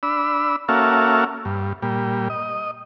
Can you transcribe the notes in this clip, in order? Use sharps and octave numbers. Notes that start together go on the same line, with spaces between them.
D4 B5 E6
A#3 C#4 F#4 A4 E5 F5
G2
A#2 G3
D#5